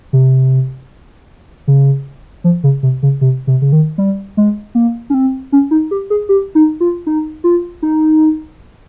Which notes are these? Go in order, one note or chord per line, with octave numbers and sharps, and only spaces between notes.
C3
C#3
F3
C#3
C3
C#3
C3
C3
C#3
D#3
G3
G#3
A#3
C#4
C4
C#4
D#4
G4
G#4
G4
D#4
F4
D#4
F4
D#4